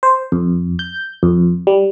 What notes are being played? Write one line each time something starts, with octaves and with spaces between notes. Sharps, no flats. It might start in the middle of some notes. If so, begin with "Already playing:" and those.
C5
F2
G6
F2
G3